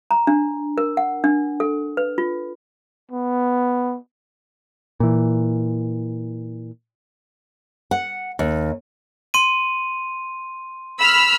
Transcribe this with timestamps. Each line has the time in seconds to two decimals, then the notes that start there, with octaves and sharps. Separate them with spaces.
0.11 A#5
0.27 D4
0.78 A#4
0.97 F#5
1.24 D4
1.60 A4
1.97 B4
2.18 F4
3.11 B3
5.00 A#2 E3
7.91 F#5
8.39 D#2
9.34 C6 D#7
10.99 B5 E6 F6